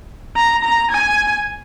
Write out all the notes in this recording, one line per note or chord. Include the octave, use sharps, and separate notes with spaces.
A#5
A#5
G#5